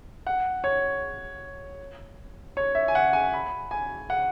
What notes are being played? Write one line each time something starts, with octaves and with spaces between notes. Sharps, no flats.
F#5
C#5
C#5
E5
G#5
F#5
G#5
B5
G#5
F#5